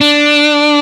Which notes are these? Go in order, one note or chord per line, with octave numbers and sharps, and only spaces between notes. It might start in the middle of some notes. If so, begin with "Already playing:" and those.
D4